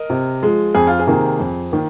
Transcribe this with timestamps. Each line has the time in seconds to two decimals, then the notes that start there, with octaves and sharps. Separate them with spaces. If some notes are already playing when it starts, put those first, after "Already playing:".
Already playing: A#4 D#5
0.10 C3
0.43 F3 G#3
0.75 F2 G#4
0.87 F4
0.99 G#4
1.07 C3 D#3 A#3
1.40 F2
1.72 D#3 A#3